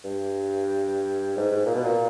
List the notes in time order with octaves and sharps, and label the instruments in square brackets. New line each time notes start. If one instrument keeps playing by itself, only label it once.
[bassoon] G2
G#2
G#2
A#2
B2
A#2